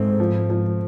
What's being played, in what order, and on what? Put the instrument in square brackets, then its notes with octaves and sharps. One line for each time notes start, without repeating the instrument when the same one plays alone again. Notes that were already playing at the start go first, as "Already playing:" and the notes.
Already playing: [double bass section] G#2 [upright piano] A3 C4
[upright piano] F3
F3